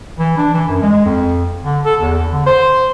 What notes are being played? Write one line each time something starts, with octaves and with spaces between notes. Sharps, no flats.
E3
D4
E3
F#2
G#3
F2
D3
A4
E2
D3
C5